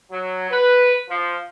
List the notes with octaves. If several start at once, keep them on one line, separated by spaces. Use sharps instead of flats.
F#3
B4
F3